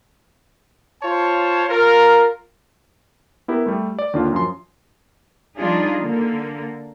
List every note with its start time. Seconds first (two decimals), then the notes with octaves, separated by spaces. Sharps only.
1.02 F4 C5 C#5 A5
1.69 F4 A#4
3.48 B3 E4 G4 A#4
3.66 G3 A3
3.99 D5
4.13 D#2 D3 D4 F4
4.32 F#2 F3 C6
5.57 F3 G3 D4 D#4 F4 G#4
6.00 D3 A#3